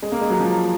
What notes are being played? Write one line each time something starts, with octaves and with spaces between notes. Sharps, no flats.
G#3
A#3
G#3
F#3
F3